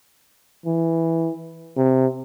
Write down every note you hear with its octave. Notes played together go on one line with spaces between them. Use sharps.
E3
C3